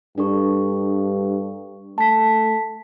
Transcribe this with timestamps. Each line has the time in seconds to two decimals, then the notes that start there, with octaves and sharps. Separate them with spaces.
0.18 G2 D4 A4 C#6
1.98 A3 A5 B6